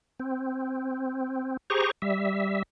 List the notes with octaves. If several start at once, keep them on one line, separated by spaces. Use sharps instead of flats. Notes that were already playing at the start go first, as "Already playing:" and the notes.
C4
G4 G#4 C5 A#5 C#6
G3 E5